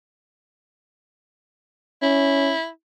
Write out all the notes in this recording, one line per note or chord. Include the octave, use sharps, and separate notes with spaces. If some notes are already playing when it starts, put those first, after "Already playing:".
C#4 E4